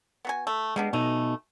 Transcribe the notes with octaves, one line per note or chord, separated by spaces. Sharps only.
B3 F#4 G#5
A3
G3 G#3 B3 D4
B2 E3 A3 D#4